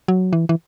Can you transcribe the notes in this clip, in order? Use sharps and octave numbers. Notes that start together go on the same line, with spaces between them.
F#3
E3
E3